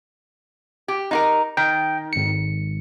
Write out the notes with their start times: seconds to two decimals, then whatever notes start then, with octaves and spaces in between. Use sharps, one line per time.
0.88 G4
1.11 D#4 F4 A#4
1.57 D#3 G5
2.13 G#1 C#7